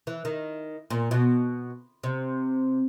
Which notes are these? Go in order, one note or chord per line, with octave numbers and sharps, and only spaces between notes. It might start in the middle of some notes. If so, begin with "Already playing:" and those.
E3
D#3
A#2
B2
C3